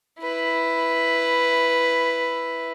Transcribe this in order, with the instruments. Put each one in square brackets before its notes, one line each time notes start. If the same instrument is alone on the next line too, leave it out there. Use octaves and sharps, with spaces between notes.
[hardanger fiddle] E4 B4